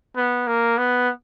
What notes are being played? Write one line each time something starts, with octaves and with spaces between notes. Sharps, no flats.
B3
A#3
B3